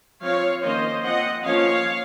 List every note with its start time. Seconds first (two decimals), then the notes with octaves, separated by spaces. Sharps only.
0.22 F3 C4 C#5 F5
0.63 D#3 A#3 C#4 C5 D#5
1.04 F3 C4 D#5 F#5
1.45 F3 A#3 C#4 C#5 F5